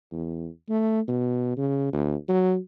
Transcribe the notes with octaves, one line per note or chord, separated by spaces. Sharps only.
E2
A3
B2
C#3
D2
F#3